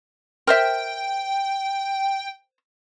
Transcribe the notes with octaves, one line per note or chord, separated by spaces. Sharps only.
A#4 C5 E5 G5